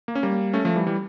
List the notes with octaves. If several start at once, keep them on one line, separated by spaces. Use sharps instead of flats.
A#3
C#4
G3 A#3
A3 C#4
F3 A3
E3 G3
E3 G3